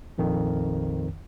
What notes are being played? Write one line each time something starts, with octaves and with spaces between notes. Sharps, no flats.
A#1 F2 D#3